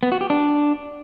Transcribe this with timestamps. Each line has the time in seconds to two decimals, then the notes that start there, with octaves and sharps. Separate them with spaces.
0.03 B3
0.12 F#4
0.21 G4
0.30 D4